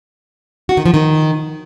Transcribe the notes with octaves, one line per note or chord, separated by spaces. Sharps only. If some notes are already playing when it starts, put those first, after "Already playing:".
F#4
D#3
F3
D#3